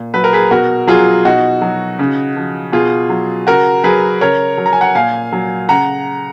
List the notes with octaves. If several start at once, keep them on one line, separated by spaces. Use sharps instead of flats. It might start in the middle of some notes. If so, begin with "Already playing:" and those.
Already playing: A#2
F#3 B4
A#4
G#4 B4
B2 F#4 A#4
F#3 F4 G#4
B2 D#4 F#4
F#3
C#3
F3
B2 F4 G#4
F#3
C#3 F#4 A#4
F#3 G#4 B4
C#3 A#4 C#5
F#3
A#5
G#5
F#5 A#5
A#2 F5 G#5
F#3
C#3 F#5 A#5